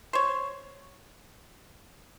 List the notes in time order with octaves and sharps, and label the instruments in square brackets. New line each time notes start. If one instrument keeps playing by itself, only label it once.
[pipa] C5 C#5